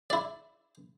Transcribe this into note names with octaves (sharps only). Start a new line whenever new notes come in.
E4 D5